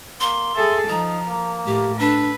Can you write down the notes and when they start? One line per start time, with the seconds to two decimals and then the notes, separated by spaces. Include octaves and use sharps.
0.20 A#3 C6
0.56 G#4 A4 E5
0.89 F3 D#4 A#5
1.27 A#3
1.66 A2 G4
1.99 D4 A4 B4